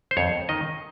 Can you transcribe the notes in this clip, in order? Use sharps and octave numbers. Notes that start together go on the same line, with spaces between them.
C5
F2 C#5
D#3 D#5